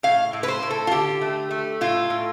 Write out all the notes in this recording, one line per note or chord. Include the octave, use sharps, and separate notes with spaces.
A2 F5
A2
B4
C5
A2
A4
F4
D3 G4
A3
A3
A2 F4
A2